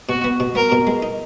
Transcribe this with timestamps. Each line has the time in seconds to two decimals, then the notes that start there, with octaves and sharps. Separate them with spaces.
0.09 B2 F#4
0.24 B3
0.40 B2
0.55 B3 A#4
0.72 B2
0.87 G#3
1.03 D#4